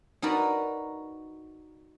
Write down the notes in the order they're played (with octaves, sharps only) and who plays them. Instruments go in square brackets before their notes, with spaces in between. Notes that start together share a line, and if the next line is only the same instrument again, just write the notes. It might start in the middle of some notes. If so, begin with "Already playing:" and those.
[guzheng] D#4 F#4 A#4 B4 D5